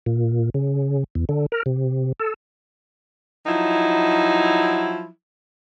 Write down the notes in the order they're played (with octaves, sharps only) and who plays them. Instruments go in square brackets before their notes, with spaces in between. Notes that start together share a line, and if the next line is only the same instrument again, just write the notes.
[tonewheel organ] A#2
C#3
E2
D3
A#4
C3
A4
[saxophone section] F3 F#3 D#4 E4